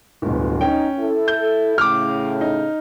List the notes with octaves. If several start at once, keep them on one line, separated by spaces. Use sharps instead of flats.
D1 G1 B2
C#4 D#4 G5
E4 A4
G6
A2 C#3 D6 F6
D#4